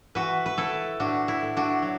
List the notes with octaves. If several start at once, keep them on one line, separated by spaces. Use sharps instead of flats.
E3 F#4 B4
B4
A3 E4 A4
A2 D4 F#4
E4
A2
D4 F#4
F#3